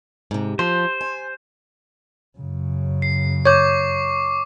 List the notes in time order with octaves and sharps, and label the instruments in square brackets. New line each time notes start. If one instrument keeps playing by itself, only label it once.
[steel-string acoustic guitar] G#2 C3
[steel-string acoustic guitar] F3 [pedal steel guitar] C5
[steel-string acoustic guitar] G#5
[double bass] F#2 C#3
[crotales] C7
[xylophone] C#5 G6 [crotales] C#6 D6